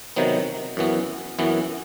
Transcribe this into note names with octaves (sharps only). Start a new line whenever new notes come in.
C3 D#3 F#3 B3
F#2 E3 B3
F#2 E3 B3